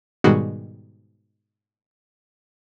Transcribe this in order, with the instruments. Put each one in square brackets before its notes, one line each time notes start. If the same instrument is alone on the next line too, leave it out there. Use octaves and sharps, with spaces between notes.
[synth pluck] G#2 B2 D#3 G3 G#3 F#4